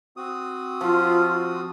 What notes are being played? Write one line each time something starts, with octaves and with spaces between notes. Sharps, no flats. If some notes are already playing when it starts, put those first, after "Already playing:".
C4 F#4 D#6
F3 F4